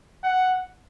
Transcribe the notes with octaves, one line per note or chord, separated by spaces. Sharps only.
F#5